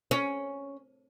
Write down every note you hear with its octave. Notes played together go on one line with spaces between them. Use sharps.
C#4